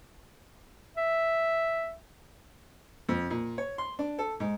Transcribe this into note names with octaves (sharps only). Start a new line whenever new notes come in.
E5
F2
A#2
C#5
C6
D4
A4
G#2